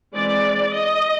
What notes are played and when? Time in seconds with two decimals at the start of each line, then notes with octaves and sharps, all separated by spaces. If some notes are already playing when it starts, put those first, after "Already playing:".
0.15 E3 G#3 C4 D5
0.73 D#5